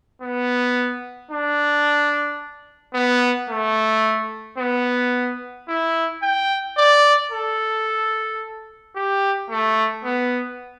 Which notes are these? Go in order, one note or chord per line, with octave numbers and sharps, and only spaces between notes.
B3
D4
B3
A3
B3
E4
G5
D5
A4
G4
A3
B3